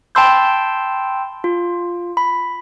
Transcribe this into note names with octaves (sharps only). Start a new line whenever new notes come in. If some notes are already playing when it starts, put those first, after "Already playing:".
G5 A5 B5 C6 E6 G6
F4
B5